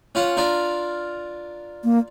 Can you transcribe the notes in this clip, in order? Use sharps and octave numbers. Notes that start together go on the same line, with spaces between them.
C#4 F4 F#5
D4 F4 A#4
A#3